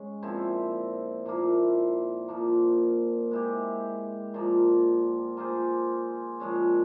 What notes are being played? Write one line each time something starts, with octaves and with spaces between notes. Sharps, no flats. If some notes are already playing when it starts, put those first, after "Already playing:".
Already playing: G#3 C#4
A#2 F3 C4 E4
A#2 F3 A#3 E4
A#2 F3 A#3
G#3 E4 G4
A#2 F3 A#3
A#3 F4 G#4 C5
A#2 F3 G#3 C#4